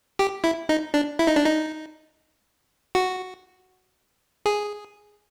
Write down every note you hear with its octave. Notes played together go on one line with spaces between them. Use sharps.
G4
E4
D#4
D4
E4
D#4
D4
D#4
F#4
G#4